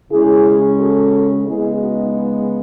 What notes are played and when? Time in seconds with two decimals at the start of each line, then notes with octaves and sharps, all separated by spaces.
0.11 C#3 G#3 C#4 E4 G#4
0.79 F#4 A4
1.46 C#3 G#3 B3 E4 G#4
1.79 D#4 F#4
2.14 D#4